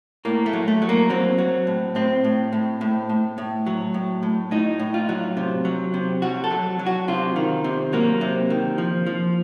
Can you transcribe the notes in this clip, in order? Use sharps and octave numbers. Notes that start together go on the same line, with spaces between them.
A2 A#3
A3
F#3
A3
F#3
A#3
F#3 C4
F#3
A2
A2 C4
A2
A2
A2
A2
A2
F#3
A2
A2
A2 D#4
A2
F4
F#3
C3
F#3
C3
F#3 F#4
A4
F#3
F#3
F#4
C3 F4
D#3
C3
F#3 A#3
C3
D#3
F3
F3